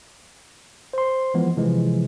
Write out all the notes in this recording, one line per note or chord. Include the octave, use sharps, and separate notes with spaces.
C5 C6
E3 F3 G#3 B3
C3 E3 F3 G#3